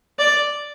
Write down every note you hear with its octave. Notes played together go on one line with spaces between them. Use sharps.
D5